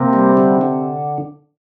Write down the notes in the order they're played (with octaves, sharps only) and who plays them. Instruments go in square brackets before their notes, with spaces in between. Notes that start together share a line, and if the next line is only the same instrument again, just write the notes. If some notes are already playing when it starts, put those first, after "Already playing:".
Already playing: [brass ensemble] C3 [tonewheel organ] A#3
[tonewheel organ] G3
D3
D3